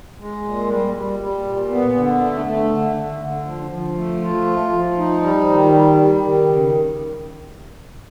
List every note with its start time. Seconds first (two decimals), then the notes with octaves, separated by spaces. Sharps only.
0.19 G#3
0.44 A#2
0.69 G3
0.95 G3
1.19 G3
1.45 A#2
1.70 B3
1.95 D3
2.20 A3
2.46 A3
2.71 D3
2.96 D3
3.20 D3
3.45 F3
3.71 F3
3.96 A3
4.22 F4
4.46 F3
4.72 F3
4.97 D#4
5.21 G3
5.47 D#3
5.72 G3
5.97 G3
6.23 D#3
6.47 C#3